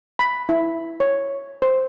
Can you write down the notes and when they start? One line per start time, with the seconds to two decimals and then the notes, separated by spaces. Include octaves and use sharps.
0.19 B5
0.49 E4
1.00 C#5
1.62 C5